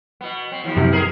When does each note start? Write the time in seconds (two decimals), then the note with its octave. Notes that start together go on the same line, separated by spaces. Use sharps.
0.21 B2 B3
0.52 C4
0.64 D#2 F3
0.76 F#2 C3
0.92 D#2 G#4 A#4